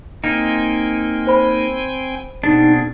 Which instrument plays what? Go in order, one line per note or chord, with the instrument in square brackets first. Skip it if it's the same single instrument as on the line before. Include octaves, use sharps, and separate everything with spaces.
[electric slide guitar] A#3 D#4 [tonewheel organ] C4 G5 G#5
[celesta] C5 B5
[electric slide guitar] B2 D4 [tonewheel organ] C4 G#4 [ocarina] D#4